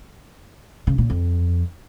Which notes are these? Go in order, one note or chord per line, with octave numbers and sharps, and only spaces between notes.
C#3
A#2
F2